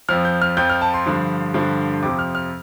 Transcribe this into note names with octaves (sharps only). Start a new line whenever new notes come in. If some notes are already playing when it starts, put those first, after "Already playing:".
F2 F3 F6
G6
F6
F2 F3 G6
F6
A5
C6
G2 D3 F3
G2 D3 F3
F2 C3 F3 D6
F6
F6